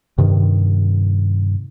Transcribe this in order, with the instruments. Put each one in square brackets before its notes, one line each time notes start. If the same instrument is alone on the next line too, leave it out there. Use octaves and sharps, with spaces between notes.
[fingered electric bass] G2 C3 D#3